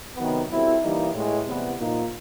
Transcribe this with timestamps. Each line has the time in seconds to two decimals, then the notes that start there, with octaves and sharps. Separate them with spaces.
0.17 C3 D#3 F#3 B3
0.49 B2 G3 C4 E4 A4
0.82 E3 G3 A#3 D#4
1.14 A2 E3 G#3
1.46 C3 E3 G3 B3
1.79 A#2 F3 A#3 D#4